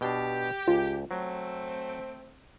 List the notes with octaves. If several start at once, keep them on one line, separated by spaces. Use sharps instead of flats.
B2 D4 G4
C#2 F4
F#3 A3 C4